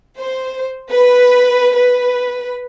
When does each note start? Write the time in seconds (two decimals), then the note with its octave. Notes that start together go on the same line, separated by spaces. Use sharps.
0.17 C5
0.90 B4
1.75 B4